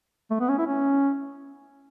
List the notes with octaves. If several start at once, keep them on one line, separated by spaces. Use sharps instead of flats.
A3
B3
C#4
E4
C#4